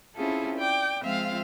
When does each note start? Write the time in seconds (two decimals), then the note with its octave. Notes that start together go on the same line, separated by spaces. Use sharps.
0.16 C4 C#4 E4 F4 G#4 A4
0.57 D5 G5 D6
1.03 F3 G#3 C4 F4 E5 F5